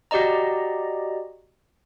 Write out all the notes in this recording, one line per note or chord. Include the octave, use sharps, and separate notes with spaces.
F#4 G4 D5 D#5 A#5